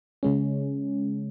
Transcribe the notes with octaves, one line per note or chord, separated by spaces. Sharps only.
C#3 G#3 C#4